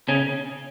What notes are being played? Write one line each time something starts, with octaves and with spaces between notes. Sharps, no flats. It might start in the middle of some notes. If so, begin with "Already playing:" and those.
C#3 C#4